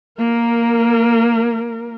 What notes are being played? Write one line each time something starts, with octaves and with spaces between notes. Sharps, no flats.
A#3 A#4